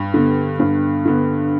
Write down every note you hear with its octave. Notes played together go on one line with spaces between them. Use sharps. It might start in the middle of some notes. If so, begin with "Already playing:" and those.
Already playing: G2
D3 B3
G2
D3 B3